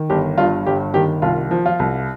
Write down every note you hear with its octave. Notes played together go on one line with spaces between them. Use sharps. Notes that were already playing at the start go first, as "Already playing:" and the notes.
Already playing: D#3
G1 G4
G2 F4
G1 G4
D#3 G4
C2 F4
F3
F4
C2